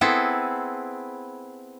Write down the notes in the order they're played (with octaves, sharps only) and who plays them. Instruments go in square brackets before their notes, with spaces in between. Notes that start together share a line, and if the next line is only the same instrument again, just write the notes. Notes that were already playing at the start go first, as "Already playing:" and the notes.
[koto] B3 C4 E4 G#4 A4